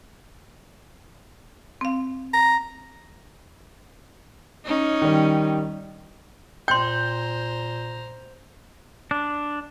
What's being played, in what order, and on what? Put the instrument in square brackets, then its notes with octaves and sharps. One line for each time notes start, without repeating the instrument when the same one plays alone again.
[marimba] C4 F5
[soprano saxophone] A#5
[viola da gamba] C#4 D#4
[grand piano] D#3 G3
[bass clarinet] A#2 [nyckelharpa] C5 A#5 [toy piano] G5 C6 [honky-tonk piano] G6
[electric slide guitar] D4